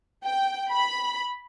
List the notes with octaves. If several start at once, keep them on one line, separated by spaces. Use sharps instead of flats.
G5
B5